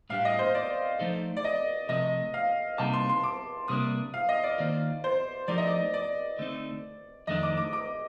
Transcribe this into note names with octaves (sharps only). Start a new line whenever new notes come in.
A2 G3 D4 G4 F5
D#5
C5
D5
F3 A3 D#4 A4 C5
D5
D#5
C3 F3 A3 D#5
F5
C3 G3 A#3 D#4 A5
C6
C6
D6
C3 G3 A#3 D4 D#6
F5
D#5
D5
D#3 A#3 F4 C5
C5
F3 A3 D#4 G4 A#4 D5
D#5
D5
D5
D3 A3 C4 D#4
F2 D#3 A3 D4 D#5
D6
D6
D6